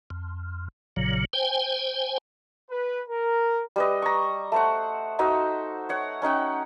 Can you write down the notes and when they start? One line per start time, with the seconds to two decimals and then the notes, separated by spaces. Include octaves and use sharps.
0.10 F2
0.96 A#1 A#2 C#3 F#3
1.33 C5 G5 G#5
2.71 B4
3.09 A#4
3.76 G3 B4 D#5
4.02 A#5 C#6
4.52 A3 C5 F#5
5.19 D#4 F#4 C5 E5
5.89 C#5 F#5
6.22 C#4 D#4 F#5 G5